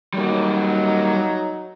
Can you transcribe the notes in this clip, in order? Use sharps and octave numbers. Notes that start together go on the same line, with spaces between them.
F#3 G3 A#3 D#4